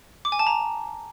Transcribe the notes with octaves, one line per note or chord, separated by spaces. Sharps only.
D6
G#5
A5
A#5